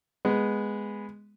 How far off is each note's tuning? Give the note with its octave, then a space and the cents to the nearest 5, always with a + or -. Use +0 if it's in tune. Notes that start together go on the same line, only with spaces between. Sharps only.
G#3 -5 B3 +0